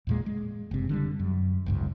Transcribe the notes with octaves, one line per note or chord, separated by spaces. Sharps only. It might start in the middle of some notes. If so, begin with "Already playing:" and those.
E2 A#2 G#3
G#3
F#1 C3
D3 F3 G3
F#2
G1 C#2 G#2